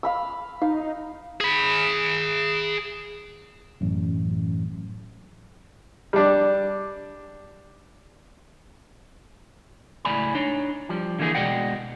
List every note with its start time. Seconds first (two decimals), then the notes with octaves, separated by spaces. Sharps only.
0.03 F5 B5 E6
0.62 D#4 F5
1.41 G#4 B5
3.81 A1 F#2
6.13 G3 D4
10.05 C#2 A2 F#3 D5 G#5 B5
10.35 D4 D#4 C#5
10.89 F3 G3
11.19 D3 E3 A#3 D#4 G#4
11.35 B2 G#3 D5 D#5 F#5 G5